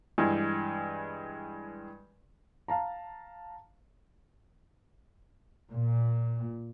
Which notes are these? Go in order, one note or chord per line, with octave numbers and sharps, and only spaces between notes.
G2 E3 G#3
F5 A5 A#5
A#2